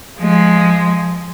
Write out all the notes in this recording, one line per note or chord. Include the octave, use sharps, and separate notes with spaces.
F3 G#3